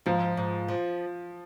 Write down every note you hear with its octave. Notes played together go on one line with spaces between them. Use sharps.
G#2 F3
G#2
F3